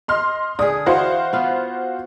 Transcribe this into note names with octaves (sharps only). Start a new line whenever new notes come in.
D#5 C6 F6
D3 G#4 D#6
E3 F#4 C5 F5
B3 F4